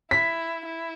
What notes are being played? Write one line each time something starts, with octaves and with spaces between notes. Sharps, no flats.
E4 B6
E4